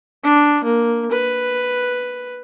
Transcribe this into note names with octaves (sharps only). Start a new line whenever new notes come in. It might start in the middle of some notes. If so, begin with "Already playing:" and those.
D4
A#3
B4